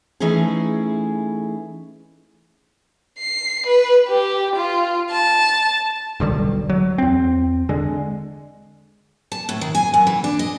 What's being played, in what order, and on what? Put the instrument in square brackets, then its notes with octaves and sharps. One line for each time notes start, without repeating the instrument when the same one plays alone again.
[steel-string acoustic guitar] E3 A3 C#4 D#4 E4 G#4
[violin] C7
B4
G4
F4
A5
[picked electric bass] E1 B1 D3 G3
F#3
E2 C4
D3 G#3
[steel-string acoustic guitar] A5
A2
D#3
G#5
F#2
E3
D4
D#5